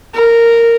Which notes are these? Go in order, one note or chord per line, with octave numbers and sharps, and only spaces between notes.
A#4